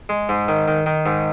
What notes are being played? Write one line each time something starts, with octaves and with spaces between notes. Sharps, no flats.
G#3
G#2
D#3
D#3
D#3
G#2